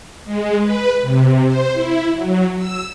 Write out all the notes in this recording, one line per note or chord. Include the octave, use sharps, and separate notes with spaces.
G#3
B4
C3
C5
E4
F#3
E6